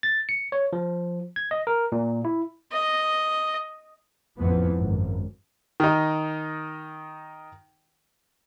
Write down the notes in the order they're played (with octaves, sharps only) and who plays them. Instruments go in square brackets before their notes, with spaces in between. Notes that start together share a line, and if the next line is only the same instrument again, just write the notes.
[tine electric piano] A6
C#7
C#5
F3
G#6
D#5
A#4
A#2
E4
[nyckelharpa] D#5
[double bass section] A1 F2 E3 F3 B3
G#1 F#2
[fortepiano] D#3 D#4